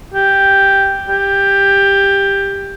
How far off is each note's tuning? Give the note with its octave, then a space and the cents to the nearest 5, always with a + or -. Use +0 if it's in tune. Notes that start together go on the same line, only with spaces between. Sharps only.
G4 +0
G4 +10